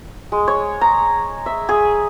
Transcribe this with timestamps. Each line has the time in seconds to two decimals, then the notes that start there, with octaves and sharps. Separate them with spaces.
0.32 G#3
0.48 C#5
0.81 A#5
1.46 E5
1.69 G#4